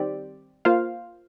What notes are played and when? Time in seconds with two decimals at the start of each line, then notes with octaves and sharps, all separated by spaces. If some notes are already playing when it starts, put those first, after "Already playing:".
Already playing: D#3 G3 C4 G4 D5
0.65 A#3 F4 C5 F5